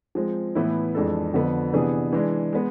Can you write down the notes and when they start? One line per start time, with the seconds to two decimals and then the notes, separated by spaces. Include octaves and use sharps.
0.15 F3 G#3 C4
0.55 A2 E3 B3 E4
0.95 F2 E3 G#3 D4 A4
1.34 F2 D3 F3 B3
1.73 C3 E3 B3 D4 G#4
2.13 E3 G#3 D4
2.53 G#3 B3